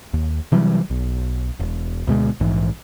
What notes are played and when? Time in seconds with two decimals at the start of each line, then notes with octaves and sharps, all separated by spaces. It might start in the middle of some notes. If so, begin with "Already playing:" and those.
0.14 D#2
0.52 C3 E3 F#3 G3
0.90 B1
1.60 E1
2.07 D2 B2 G#3
2.40 A#1 G#2 E3